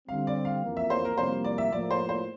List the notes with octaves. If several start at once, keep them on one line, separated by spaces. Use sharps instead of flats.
D3 G3 C4 F5
D5
F5
F2 E3 A#3
E5
C5
A#4
F2 C3 E3 G3 A#3 C5
D5
E5
A2 F3 A#3 D5
C5
C5